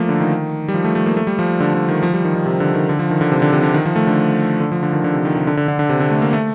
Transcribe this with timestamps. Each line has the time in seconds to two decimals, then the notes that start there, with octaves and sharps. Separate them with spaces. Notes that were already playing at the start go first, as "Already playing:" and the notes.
Already playing: F3 A3 A#3
0.09 D3
0.20 D#3
0.68 G3
0.74 F3
0.84 A3
0.95 A3
1.06 A#3
1.17 A3
1.27 G3
1.39 F3
1.60 D3
1.74 D3
1.89 D#3
2.03 F3
2.14 G3
2.25 D#3
2.35 D#3
2.46 C3
2.60 D3
2.74 D#3
2.89 D3
2.99 F3
3.10 D#3
3.21 D3
3.32 C3
3.42 D3
3.53 C3
3.63 D3
3.74 D#3
3.85 F3
3.96 A3
4.07 D3
4.60 D3
4.72 F3
4.83 D3
4.93 D#3
5.04 D3
5.14 C3
5.25 D#3
5.35 C3
5.47 D3
5.57 D3
5.68 D3
5.79 D3
5.89 C3
6.00 D3
6.10 A3
6.22 A#3
6.33 A3